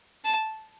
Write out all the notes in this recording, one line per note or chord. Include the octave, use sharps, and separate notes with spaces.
A5